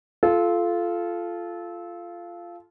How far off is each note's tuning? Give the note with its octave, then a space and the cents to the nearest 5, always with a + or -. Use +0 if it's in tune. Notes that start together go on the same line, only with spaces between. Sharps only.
F4 -10 A4 -20